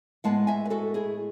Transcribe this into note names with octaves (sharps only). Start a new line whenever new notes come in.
A2 G#3 B3 F#5 A5
E5 G#5
B4
F#4 A4
E4 G#4